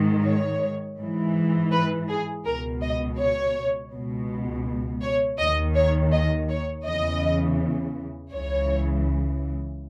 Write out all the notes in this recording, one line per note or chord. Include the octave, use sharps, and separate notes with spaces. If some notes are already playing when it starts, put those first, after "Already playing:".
Already playing: G#2 D#3
C#5
G#2 E3
B4
G#4
C#2 B2 A#4
D#5
C#5
C#2 B2
C#5
D#2 D#3 D#5
C#5
D#5
C#5
E2 C#3 E3 D#5
C#2 C#3 E3 C#5